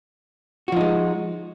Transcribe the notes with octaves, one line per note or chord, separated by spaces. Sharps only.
F3 G#3 D#4 F#4